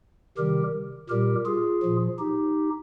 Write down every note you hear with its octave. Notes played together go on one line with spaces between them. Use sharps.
C3 D#3 G3 G4 A#4
A#2 G3 G4 A#4
F4 G#4
A#2 F3
D#4 G4